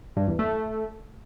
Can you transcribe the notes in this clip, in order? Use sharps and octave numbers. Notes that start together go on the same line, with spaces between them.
G2
E2
A3